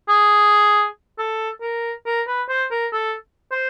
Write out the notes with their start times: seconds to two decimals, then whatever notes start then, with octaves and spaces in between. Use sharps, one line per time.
0.09 G#4
1.18 A4
1.61 A#4
2.06 A#4
2.27 B4
2.49 C5
2.71 A#4
2.92 A4
3.51 C5